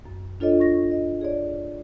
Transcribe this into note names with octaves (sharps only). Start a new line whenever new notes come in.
F#2
D4 F4 A4 C#5 D#5
C#6 A#6
D#5
G#4 C#5 D5